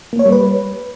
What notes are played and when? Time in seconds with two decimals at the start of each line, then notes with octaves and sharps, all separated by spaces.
0.13 A#3
0.19 C#5
0.26 G3
0.32 B4